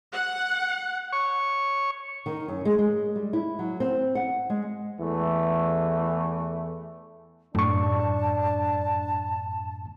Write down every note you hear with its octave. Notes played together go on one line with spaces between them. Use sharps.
F#5
C#5 C#6
D#3
F#2
G#3
G#3
G3
E4
F#3
C4
F#5
G#3
E2 E3 A3
F#2 A2 D4 A5 C#6